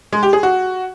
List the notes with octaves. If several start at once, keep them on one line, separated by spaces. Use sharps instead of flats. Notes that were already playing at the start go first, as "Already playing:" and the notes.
G#3
G4
G#4
F#4